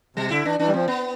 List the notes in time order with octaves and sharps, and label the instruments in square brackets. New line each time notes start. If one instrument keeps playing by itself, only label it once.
[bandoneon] C3 [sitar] G3
[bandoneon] D3 [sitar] E4
[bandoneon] E3 [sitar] D4
[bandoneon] E3 [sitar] D4
[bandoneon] G3
[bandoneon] F3 [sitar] C4
[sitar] B3